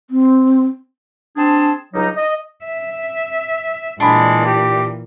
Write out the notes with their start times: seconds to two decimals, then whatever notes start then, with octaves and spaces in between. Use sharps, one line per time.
0.10 C4
1.37 C4 D4 G#4 C5 A5
1.94 C#2 F#3 G3 D#4
2.16 D#5
2.64 E5
4.00 A#2 E3 G#3 D4 B5
4.46 G4